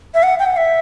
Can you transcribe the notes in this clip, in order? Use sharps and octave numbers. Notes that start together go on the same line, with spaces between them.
E5
F#5
G5
F#5
E5